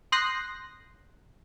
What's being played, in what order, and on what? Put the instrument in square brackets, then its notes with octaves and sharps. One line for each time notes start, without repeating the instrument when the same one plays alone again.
[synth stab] C6 D#6 F#6 G6 A#6 C7